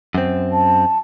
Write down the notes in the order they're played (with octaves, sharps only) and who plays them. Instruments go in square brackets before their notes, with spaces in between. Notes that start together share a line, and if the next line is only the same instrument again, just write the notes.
[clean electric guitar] F#2 C4
[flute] A5